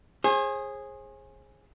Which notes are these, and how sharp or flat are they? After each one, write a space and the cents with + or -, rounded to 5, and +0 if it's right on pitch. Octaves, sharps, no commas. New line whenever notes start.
G#4 -5 C5 +45